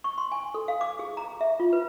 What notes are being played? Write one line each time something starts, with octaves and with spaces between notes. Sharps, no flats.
C#6
C6
G#5
A4
F5
D6
G#4
A#5
E5
F4
B4